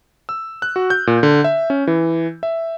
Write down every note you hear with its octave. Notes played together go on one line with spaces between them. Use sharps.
E6
F#6
F#4
G6
A#2
D3
E5
C#4
E3
E5